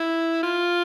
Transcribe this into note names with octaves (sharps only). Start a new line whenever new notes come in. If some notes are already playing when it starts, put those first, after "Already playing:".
Already playing: E4
F4